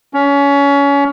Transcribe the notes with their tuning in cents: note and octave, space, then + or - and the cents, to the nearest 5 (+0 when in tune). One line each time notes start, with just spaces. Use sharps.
C#4 +25